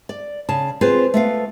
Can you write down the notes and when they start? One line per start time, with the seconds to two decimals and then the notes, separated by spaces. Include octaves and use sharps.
0.09 D5
0.49 C#3 A5
0.81 C4 F4 G#4 B4 C5
1.14 A3 B3 F5